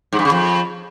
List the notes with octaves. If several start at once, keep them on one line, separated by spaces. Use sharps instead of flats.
G#2
G2
C#3
F2